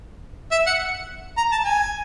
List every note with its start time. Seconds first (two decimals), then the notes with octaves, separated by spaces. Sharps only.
0.52 E5
0.67 F#5
1.37 A#5
1.52 A5
1.65 G#5